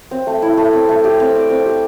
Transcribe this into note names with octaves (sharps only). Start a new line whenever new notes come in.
C4
A3
E4
A3
C4
A3
G4
C4
D5
C4
G4